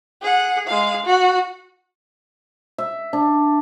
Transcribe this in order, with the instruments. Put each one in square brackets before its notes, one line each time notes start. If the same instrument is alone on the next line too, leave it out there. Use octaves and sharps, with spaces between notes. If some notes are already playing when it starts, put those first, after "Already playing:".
[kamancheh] G#4 F#5
G#3 F5
F#4
[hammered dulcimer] E5
D4